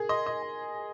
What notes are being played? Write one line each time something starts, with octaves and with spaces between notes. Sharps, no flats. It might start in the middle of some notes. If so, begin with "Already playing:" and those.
Already playing: G#4 A#4
D#5 C6
D#5
G#5
G#5